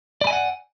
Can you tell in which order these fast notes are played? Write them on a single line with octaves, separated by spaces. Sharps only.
D5 B5 G#5 D#5 F#5